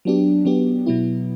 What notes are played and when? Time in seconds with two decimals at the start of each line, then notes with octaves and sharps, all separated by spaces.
0.05 F#3 B3 D4 G4
0.45 F#3 B3 D4 G4
0.86 B2 F#3 B3 E4